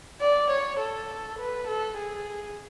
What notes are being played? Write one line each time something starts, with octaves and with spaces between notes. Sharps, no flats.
D5
C#5
A4
B4
A4
G#4